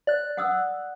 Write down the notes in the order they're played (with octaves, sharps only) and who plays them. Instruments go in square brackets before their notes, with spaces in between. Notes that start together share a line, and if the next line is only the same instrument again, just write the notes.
[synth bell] D5 F#6
[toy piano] F#5 D#6 E6